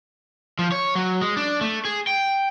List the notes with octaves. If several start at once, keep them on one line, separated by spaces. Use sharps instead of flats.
F3
C#5
F#3
G#3
D4
A3
G#4
G5